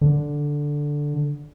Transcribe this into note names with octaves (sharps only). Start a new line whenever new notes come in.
D3